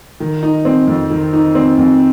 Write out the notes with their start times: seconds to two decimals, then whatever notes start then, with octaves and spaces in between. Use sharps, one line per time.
0.20 D#3
0.43 D#4
0.65 C4
0.87 F2
1.10 D#3
1.33 D#4
1.55 C4
1.78 F2